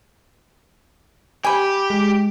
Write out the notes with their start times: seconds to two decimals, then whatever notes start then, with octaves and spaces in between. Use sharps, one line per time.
1.44 G4 G#5 B5
1.90 G#3